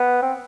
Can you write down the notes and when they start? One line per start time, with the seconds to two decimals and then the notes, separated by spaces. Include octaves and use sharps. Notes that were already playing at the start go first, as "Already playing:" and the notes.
Already playing: B3
0.22 C4